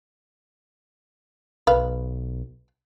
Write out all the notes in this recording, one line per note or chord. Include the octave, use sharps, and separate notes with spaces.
B1 B4 F5